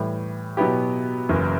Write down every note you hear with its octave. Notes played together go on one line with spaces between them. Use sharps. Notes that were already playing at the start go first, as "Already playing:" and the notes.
Already playing: A2 E3 G3
B2 F#3 B3 E4 G4
F#1 F#2 E3